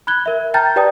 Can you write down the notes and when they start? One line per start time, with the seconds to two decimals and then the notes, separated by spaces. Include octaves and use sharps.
0.07 B5 F#6 G#6 G7
0.26 A#4 E5
0.54 G5 A5 A#5 F6 G6 A6
0.76 G4 B4 D5 G5 A5 D#6